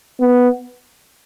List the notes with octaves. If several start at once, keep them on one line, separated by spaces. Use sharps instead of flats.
B3